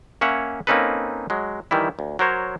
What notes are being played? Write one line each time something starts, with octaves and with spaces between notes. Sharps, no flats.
A#3 C#4 C#5 E5 F#5
A#3 C4 C#4 D#4 A4 B4
F#3 G#3
D#3 E3 G3 E4
D2
F#3 A#4 C5 C#5